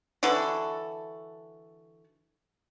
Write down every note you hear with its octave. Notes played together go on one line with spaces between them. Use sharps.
D3 E3 F#4 A4